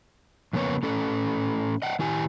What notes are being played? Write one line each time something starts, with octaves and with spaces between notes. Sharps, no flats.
F2 C#3 A#3 B3 C#5
A2 C#4 A4
D#5 F#5 G5
D#3 E4 G4 G#5